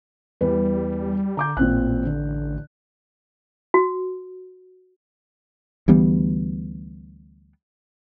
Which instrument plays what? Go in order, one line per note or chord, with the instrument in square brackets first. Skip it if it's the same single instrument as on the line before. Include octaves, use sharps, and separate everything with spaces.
[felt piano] E2 B4 [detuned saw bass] G3
[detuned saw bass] D3 [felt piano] A#5 D6 G6
[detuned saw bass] A1 [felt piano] A#2 C4 F#6
[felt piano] D3
[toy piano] F#4
[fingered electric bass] D2 E3 G3 B3